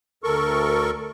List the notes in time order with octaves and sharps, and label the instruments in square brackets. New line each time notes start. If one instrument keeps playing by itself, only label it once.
[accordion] D2 A4 A#4 C#6